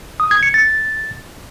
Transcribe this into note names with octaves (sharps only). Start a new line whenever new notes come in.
D#6
G#6
C#7
A6